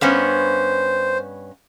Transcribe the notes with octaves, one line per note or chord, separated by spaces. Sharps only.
G2 B3 C#4 C5